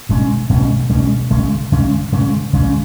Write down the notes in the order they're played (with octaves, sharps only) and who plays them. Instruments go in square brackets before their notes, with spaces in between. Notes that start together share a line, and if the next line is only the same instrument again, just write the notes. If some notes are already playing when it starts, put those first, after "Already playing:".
[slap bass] B2 G#3 C#4
B2 G#3 C#4
B2 G#3 C#4
C#3 G#3 C#4
C#3 G#3 C#4
C#3 G#3 C#4
C#3 G#3 C#4